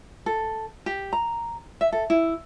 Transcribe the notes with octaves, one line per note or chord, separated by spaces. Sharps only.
A4
G4
A#5
E5
A4
E4